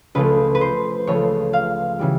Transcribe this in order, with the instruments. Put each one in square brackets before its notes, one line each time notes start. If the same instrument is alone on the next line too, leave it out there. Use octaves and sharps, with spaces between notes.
[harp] C#2 C#3 F3 A3 B4
B4
C5
C#2 C#3 F3 A3 C#5
F5
C#3 E3 G3